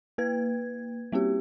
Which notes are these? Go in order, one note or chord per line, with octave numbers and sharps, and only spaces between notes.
A#3 B4 G#6
G3 A#3 C4 G4